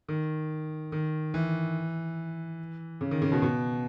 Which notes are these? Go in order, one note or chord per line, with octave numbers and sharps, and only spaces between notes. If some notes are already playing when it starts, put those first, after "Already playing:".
D#3
D#3
E3
C#3
D#3
C#3
B2
B2